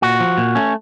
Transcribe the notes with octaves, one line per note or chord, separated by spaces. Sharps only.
A#2 F#4
F3
A#2
A3 C#4